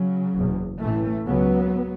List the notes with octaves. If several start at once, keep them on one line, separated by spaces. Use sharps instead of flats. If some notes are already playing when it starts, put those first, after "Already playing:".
Already playing: C#3 F#3
F#1 E2 B2
A1 A2 E3 A3
C#2 C#3 F#3 B3